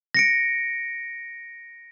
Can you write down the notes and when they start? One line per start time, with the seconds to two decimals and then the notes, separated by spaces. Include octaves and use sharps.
0.14 A#6 C#7 D7